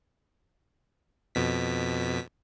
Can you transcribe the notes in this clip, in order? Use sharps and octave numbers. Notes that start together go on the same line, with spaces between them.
F2 B2 B6